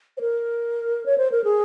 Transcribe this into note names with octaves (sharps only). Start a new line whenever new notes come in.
C5
A#4
C#5
C5
A#4
G#4